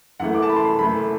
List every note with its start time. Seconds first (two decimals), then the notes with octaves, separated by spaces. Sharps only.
0.20 F#2 E3 A3 F#5
0.35 D6
0.42 A5
0.49 B5
0.56 C6
0.64 B5
0.78 F#2 E3 A3 B5